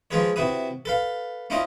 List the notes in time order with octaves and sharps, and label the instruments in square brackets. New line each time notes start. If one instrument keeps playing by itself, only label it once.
[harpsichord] F3 G#3 F4 G#4 B4 C#5
C3 E4 F#4 B4 D#6
A4 B4 F5
C#4 D4 E4 F4 C5 D#5